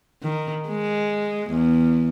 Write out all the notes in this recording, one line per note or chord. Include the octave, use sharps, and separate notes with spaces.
D#3
G#3
E2